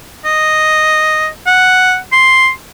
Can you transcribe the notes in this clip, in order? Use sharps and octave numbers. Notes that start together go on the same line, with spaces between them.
D#5
F#5
C6